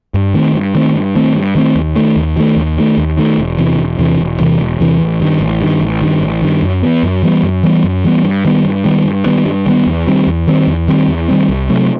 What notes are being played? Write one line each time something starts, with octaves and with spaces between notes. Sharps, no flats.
G2
D#3 A3 C4
G2
D#3 A3 C4
G2
D#3 A3 C4
G2
D#3 A3 C4
D#2
D#3 A3
D#2
D#3 A3
D#2
D#3 A3
D#2
D#3 A3
E1
E2 C3 E3
E1
E2 C3 E3
E1
E2 C3 E3
E1
E2 C3 E3
A1
G2 D#3
A1
G2 D#3
A1
G2 D#3
A1
G2 D#3
F#2
E3 G3 B3
F#2
E3 G3 B3
F#2
E3 G3 B3
F#2
E3 G3 B3
G2
D#3 G3 B3
G2
D#3 G3 B3
G2
D#3 G3 B3
G2
D#3 G3 B3
E2
D#3 G3 C4
E2
D#3 G3 C4
E2
D#3 G3 C4
E2
D#3 G3 C4
C2
C3 F#3 A3